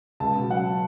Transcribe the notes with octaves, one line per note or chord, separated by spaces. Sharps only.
C#2 A5
B2
F#3 F#5